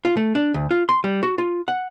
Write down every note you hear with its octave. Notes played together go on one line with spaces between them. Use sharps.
F4
A3
D4
D2
F4
C6
G3
F#4
F4
F#5